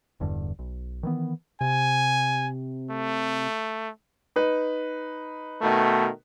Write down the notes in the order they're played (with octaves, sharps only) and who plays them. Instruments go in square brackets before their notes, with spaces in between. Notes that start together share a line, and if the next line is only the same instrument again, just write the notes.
[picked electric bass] E1 E2 G2 D3
B1
D#3 E3 B3
[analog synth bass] C3 [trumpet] G#5
[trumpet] A3
[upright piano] D#4 B4
[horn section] B2 D#3 A3